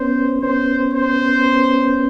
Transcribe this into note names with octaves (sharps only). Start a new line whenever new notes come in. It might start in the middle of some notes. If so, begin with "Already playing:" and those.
Already playing: B3 C#4 C5
B3 C#4 C5
C5